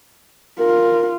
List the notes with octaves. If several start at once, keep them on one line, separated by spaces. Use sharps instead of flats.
F4 A#4